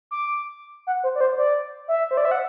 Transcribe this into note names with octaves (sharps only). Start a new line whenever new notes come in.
D6
F#5
C5
D5
C5
D5
E5
C5
D5
E5
F#5